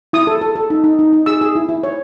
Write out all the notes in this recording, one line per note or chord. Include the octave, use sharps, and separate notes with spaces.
E4 D#6
A4
A4
A4
D#4
D#4
D#4
D#4
G#4 E6
G#4
E4
E4
C#5